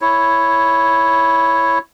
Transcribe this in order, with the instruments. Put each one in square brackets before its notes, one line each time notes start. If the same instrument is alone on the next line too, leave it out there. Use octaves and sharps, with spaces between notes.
[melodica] E4 C#5